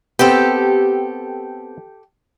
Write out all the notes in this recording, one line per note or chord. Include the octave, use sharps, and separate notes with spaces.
B3 C4 G4 A4